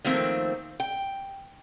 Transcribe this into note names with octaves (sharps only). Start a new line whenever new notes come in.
D#3 F3 A3 A#3 C4
G5